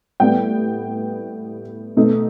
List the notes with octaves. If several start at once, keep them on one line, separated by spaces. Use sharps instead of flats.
A2 G3 B3 G5
B2 A3 D#4